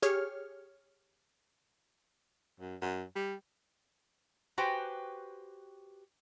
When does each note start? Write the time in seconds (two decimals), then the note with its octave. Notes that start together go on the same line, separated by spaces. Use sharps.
0.02 G4 G#4 C#5 F6
2.60 F#2
2.82 F#2
3.16 G3
4.58 F#4 G4 B4 C5 G5 G#5